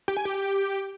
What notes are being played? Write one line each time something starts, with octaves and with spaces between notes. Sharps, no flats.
G4
G#5
G4